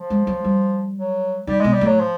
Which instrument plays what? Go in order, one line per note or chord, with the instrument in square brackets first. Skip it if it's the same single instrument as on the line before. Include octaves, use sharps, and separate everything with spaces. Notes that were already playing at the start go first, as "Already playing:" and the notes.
Already playing: [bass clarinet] F3
[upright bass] G#3
F#3
G3
[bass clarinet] F#3
[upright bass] D#3 [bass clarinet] G3
[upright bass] B2 [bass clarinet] G#3
[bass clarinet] G3
[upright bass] A2 [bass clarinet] F#3
[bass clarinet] F3